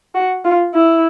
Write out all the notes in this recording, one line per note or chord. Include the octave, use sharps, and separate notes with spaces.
F#4
F4
E4